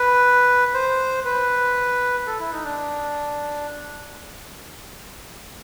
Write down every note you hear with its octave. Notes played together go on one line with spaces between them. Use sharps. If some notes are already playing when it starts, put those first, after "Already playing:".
Already playing: B4
C5
B4
A4
E4
D#4
D4